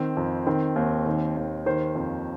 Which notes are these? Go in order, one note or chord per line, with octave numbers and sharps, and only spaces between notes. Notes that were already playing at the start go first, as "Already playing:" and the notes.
Already playing: D#3 C4
F2
D#3 C4
D#2
D#3
D#2
D#3 C5
F2